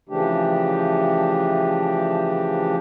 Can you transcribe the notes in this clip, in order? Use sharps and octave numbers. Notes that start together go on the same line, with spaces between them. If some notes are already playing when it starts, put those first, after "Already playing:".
C#3 E3 F3 A3 D4 G4